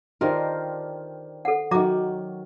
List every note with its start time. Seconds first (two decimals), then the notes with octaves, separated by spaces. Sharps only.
0.21 D#3 D4 F4 G4 A#4 C5
1.45 A4 F#5
1.71 D#3 F#3 F#4 E5 A#5 D6